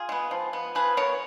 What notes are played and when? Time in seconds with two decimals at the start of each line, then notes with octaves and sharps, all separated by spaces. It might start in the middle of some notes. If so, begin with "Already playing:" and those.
Already playing: F4 G#4
0.09 G#3 B3
0.31 F3
0.53 B3
0.75 F3 G#4 B4
0.97 B3 A#4 C#5